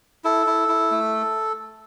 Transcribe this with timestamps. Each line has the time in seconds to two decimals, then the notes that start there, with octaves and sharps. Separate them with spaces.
0.24 E4 A4
0.47 E4
0.68 E4
0.91 A3